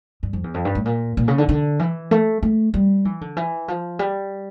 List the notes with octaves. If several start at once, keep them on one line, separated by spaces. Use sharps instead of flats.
G2
F2
E2
F2
G2
A2
A#2
A#2
C#3
D3
D3
E3
A3
A3
G3
E3
D3
E3
F3
G3